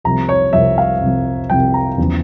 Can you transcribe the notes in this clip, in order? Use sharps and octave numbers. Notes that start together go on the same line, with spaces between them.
C2 C3 F3 A#5
C#5
C2 C3 F3 E5
F5
C2 C3 F3
C2 C3 F3 G5
A#5
E2 C#3 F3